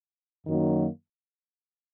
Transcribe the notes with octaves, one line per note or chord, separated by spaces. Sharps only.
F#2 D#3 F#3 A#3